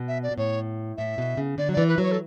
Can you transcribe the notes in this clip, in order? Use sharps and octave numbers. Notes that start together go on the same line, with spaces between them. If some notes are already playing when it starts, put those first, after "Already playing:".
Already playing: B2
E5
D5
B2
A2 C#5
A2 E5
B2
C#3
D3 D5
F#3
E3 D5
B4
F#3 C#5
A4